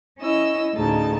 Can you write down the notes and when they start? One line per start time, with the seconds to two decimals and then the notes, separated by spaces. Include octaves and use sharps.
0.20 C#4 E4 D#5 E6
0.75 D2 A2 C#3 D#4 A5